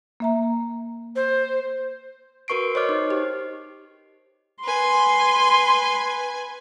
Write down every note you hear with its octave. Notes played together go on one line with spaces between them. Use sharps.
A#3 E5 A#5
C5
F#4 A#4 B4 C#6 C7 D7
C5 C#5 D#5 D6 F6 C7
D#4
G4
B4 G#5 C6